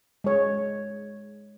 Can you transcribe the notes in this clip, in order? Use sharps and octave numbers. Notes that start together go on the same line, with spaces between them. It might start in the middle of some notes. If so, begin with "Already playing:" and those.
G#3 C#5